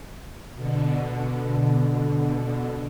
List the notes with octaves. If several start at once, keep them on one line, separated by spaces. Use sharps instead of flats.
B2 D3